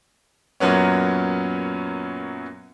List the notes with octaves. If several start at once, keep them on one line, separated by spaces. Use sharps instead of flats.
F#2 A#2 F#3 B3 C#4